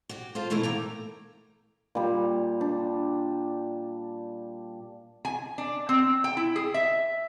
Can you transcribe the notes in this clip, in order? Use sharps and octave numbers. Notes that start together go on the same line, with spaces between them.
F#4 G4
F4 A4 C5
B2 E3 A3 E4 A4 A#4
A#3 G5 A#5
A#2 G3
D4
G#5
D4
C4
G5
E4
G#4
E5